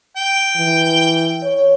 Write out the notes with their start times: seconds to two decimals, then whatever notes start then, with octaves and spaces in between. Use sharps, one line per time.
0.17 G5
0.56 E3
1.43 C#5